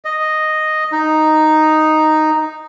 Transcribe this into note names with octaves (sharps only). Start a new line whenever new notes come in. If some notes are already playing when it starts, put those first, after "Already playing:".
D#5
D#4